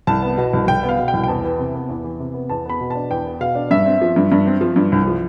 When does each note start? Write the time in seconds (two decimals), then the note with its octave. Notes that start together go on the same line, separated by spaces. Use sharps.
0.07 C2 A5
0.22 B3
0.37 B2
0.53 C2
0.67 C2 G5
0.83 B3
0.89 F5
0.99 B2
1.08 G5
1.14 C2
1.23 G5
1.28 E2 A5
1.44 E3
1.59 C3
1.74 B3
1.89 E2
2.04 E3
2.20 C3
2.34 B3
2.50 E2 A5
2.65 B3 B5
2.80 B2
2.90 D4 A5
3.11 E2 G5
3.26 B3
3.41 B2 F5
3.55 D4
3.71 G2 E5
3.86 C4
4.01 F3
4.16 G2
4.32 G2
4.46 C4
4.61 F3
4.76 G2
4.92 C2
5.07 F3